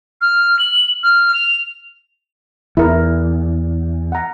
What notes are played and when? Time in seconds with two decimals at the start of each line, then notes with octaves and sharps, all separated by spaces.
0.21 F6
0.59 F#7
1.03 F6
1.34 F7
2.77 E2 E4 A#4
4.12 F#5 A#5